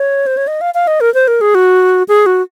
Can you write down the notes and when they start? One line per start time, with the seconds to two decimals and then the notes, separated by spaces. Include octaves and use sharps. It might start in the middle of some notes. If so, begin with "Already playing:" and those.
Already playing: C#5
0.26 C5
0.37 C#5
0.47 D#5
0.61 F5
0.74 F5
0.87 D#5
1.01 A#4
1.14 C5
1.28 A#4
1.41 G#4
1.55 F#4
2.08 G#4
2.26 F#4